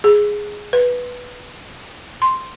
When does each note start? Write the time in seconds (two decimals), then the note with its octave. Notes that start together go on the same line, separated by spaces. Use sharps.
0.04 G#4
0.73 B4
2.22 C6